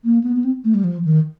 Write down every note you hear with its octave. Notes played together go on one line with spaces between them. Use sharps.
A#3
B3
B3
C4
A3
G3
F3
D#3